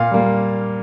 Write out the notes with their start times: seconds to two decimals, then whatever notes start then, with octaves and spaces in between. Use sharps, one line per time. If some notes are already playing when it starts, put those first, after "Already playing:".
Already playing: A#2 F5
0.11 G3 A#3